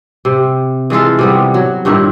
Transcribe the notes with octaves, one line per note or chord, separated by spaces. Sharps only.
C3
E3 G#3 F4 A4
C3 G3 B3
F#3
G2 A#2 D#3 E4